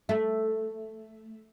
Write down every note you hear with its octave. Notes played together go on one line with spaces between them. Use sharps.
A3